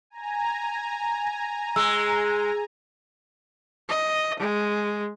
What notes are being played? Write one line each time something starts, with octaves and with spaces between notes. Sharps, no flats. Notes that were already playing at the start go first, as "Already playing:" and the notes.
G#5 A#5
G#3 E6
D#5
G#3